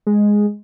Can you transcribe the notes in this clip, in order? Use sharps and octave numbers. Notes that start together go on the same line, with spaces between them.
G#3